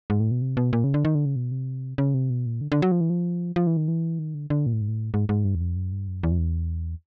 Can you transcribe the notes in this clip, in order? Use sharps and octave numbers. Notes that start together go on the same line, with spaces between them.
G#2
A2
B2
C3
B2
A#2
C#3
D3
D#3
D3
C#3
B2
C3
C#3
C3
B2
A#2
D3
D3
F#3
F3
E3
F3
F3
E3
D#3
E3
D#3
D3
D3
A#2
A2
G#2
A2
G#2
G#2
G2
E2
F2
F#2
G2
F#2
E2
F2
E2